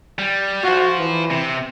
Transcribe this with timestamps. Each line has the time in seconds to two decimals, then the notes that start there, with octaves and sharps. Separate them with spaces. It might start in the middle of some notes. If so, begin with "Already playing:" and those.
0.19 G3
0.64 F4 F#4 C5
0.99 E3
1.31 C3